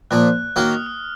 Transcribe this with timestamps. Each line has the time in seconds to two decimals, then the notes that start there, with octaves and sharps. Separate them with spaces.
0.11 A#2 F3 A#3 F#6
0.56 D#3 A#3 C#4 F#4 F6
0.71 D#6
0.86 D#6